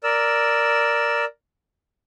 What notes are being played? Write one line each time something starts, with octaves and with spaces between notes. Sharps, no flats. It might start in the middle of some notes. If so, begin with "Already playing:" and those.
A#4 D5 E6